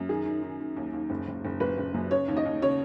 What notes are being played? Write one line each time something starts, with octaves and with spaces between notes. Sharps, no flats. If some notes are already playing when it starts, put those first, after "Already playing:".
Already playing: F#2
D#3 G#4
D#3
D#3
D#3
D#2
D#2
F#1
F#1
F#1
F#1 B4
F#1
F#2
C#3 C#5
D#2
D#5
D#2
C#3 C#5